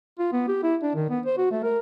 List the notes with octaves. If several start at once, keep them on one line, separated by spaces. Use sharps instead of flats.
F4
B3
G4
E4
D4
D#3
B3
C5
F#4
A3
A#4